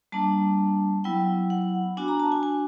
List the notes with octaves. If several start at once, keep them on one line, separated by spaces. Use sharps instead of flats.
G3 A#3 D4 A5
F#3 B3 E4 G5
F#5
B3 D4 F#4 G#5
A#5
A5
G#5
G#5